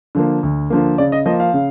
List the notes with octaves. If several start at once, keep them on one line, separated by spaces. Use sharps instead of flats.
D3 F3 A#3
D2
D3 F3 A#3
C#3 D5
D#5
F3 A#3 D#5
F5
C#3